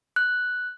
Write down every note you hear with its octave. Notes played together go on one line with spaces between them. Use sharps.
F#6